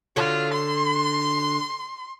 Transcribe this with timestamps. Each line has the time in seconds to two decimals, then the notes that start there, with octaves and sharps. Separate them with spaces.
0.16 D3 F4 F#4 C#5
0.53 C6